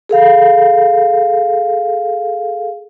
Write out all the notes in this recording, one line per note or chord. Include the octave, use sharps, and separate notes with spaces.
G#4 A4 F5